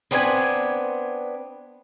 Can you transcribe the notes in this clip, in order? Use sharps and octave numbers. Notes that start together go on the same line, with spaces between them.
B3 C4 D4 B4 F5 G#5